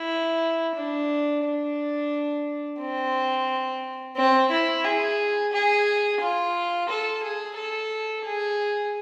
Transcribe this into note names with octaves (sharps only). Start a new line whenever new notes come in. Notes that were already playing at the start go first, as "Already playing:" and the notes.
Already playing: E4
D4
D4
C4
C4
E4
G#4
G#4
F4
A4
G#4
A4
G#4